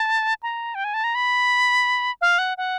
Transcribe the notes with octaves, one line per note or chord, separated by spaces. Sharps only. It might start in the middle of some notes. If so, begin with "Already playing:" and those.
Already playing: A5
A#5
G5
G#5
A5
A#5
B5
F5
F#5
F#5